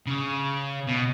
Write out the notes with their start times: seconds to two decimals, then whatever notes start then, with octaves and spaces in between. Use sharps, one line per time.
0.06 C#3
0.87 B2